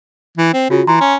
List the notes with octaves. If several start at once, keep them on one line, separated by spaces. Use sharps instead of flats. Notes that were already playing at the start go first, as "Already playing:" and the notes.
E3
C4
C#3 F4 F#4
E3 A#5 C6
C#4